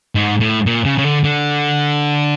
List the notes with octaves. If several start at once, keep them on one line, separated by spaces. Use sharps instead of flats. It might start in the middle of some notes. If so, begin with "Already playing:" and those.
G#2
A2
A#2
C#3
C#3
D3
D3